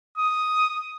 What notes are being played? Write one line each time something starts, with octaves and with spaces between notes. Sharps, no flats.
D#6